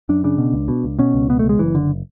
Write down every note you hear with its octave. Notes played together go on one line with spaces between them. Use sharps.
F#2 D4
C#3 D4
B2
C#2
B2
C#2
B2 C#4
C#2
B2 B3
C#2 A3
G#3
F#1 E3
F#1 D3